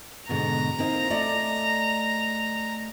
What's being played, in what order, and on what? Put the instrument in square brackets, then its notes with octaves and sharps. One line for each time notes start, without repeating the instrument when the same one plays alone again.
[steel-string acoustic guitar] G#2 B2 D3 [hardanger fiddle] A#5
[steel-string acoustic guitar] A#3 C4 D#4
A3 D5 D#5